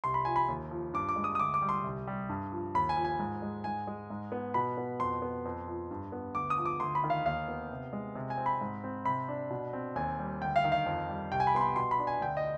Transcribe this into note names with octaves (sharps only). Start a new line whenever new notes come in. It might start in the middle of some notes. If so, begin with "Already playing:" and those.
C2 C6
B5
F3 G#5
B5
D#2
F3
G2 D6
D6
G#3
D#6
D#6
D2 D6
D6
G3
C6
C2
G3
G2
F3
D#2 B5
G#5
F3
G#5
G#2
G#3
G#2 G#5
G#3
G#2
B3
B2 B5
B3
F2 C6
B3
F2
F3
G2
B3
D2 D6
D#6
F3
D6
D2 C6
B5
D#3
F5
D#2 F5
B3
C3
G#3
C3
G#5
C4
B5
G#2
C4
C3 B5
D4
B2
C4
D#2 G#5
G3
D2 G5
F5
D#3
F5
F2
G3
C2 G5
G#5
B5
B3 C6
B5
B2 C6
B5
D4
G#5
D2 G5
D#5